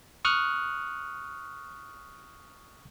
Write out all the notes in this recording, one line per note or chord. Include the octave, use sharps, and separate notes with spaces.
C#6 D#6 F6 F#6